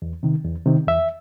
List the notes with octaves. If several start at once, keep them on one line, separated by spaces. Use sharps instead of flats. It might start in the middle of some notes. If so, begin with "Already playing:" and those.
E2
C3 D#3
E2
C3 D#3
E2 E5